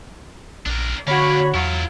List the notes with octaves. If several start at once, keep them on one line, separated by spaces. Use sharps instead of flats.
A#1 D4 A#4
D3 A#3 D4 F#4 C#5 B5
E2 F#3 E4 F4